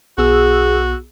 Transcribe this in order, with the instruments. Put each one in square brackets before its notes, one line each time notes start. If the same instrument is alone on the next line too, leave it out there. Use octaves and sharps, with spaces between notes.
[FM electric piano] B1 B3 E6 [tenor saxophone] F#4 [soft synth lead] G#4